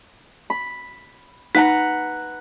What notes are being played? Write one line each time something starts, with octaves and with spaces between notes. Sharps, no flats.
B5
D#4 B4 F#5 A#5